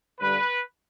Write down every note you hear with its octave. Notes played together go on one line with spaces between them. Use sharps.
G2 D3 B4